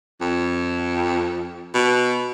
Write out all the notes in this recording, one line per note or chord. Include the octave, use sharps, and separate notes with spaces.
F2
B2